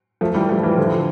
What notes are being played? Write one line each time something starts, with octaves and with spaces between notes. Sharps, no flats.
F3 A3
E3 G3
F3 A3
E3 G3
D3 F3